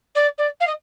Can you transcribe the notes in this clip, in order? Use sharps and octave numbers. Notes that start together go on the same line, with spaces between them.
D5
D5
F5
D#5